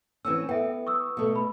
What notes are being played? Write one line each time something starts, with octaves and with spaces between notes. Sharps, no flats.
E3 C4 C#4 E6
B3 A4 E5 G5
C#6 D#6 E6
B2 A3
B5